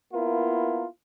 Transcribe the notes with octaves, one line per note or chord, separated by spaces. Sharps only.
A#3 B3 E4 F4 A#4